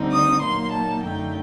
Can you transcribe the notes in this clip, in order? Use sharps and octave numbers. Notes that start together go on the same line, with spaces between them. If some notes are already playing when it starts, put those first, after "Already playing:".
Already playing: D2 D3 G3 C4 D#4
D#6
A#2 F#3 A#3 D#4 C6
A5
F#2 D3 A3 D#4 G5